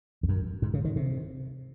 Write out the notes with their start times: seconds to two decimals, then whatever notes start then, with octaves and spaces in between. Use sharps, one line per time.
0.23 F2
0.29 F#2
0.62 G#2
0.74 C#3
0.84 D#3
0.96 C3